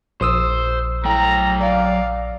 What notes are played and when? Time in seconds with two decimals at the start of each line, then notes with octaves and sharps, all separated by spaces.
0.21 A#1 C5 D#6 E6
1.05 A2 F#3 G5 A#5
1.60 D5 F5